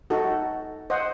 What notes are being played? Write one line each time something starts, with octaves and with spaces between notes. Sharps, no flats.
D#4 F#4 A4
C5 D#5 F#5